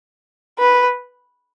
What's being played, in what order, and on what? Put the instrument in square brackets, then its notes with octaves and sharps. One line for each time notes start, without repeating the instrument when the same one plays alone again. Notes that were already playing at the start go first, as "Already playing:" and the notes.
[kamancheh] B4